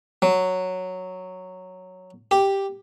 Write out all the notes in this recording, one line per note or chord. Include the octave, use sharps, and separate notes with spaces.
F#3
G4